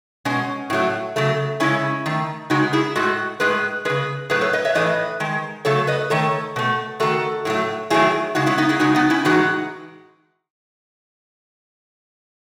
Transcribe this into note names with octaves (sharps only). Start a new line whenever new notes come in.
B2 G#3 C#4
A2 F#3 A3
C#3 F#3 A3
C#3 G#3 C#4 E4
D#3 A3
C#3 G#3 D#4 F#4
E4 G#4
A2 G#3 F#4 A4
A2 G#3 G#4 B4
C#3 G#3 G#4 B4
A2 F#3 A3 G#4 B4
A4 C#5
B4 D#5
C#5 E5
A2 E3 A3 B4 D#5
D#3 G#3
C#3 F#3 A3 A4 C#5
B4 D#5
D#3 A3 A4 C#5
B2 A3
D#3 A3 F#4 A4
A2 F#3 A3
D#3 F#3 A3 E4 G#4
C#3 G#3 D#4 F#4
C#4 E4
B3 D#4
E4 G#4
C#3 G#3 D#4 F#4
B3 D#4
C#4 E4
A2 E3 G#3 D#4 F#4